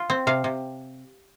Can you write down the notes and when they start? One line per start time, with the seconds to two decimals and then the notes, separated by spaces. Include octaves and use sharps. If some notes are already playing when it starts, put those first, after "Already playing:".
Already playing: F4
0.10 C4
0.27 C3 F5
0.44 C3